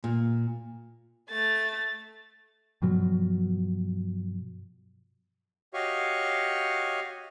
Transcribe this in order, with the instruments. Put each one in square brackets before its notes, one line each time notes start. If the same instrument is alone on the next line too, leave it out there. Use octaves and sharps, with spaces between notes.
[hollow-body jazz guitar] A#2
[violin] A3 A6
[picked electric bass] G2 B2 F3 F#3
[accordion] F#4 G4 C#5 D#5 F5 C#6